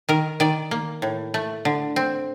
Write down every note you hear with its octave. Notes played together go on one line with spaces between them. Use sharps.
D#3 A#4
D#3 D5
A#3
A2
A3
D3
C4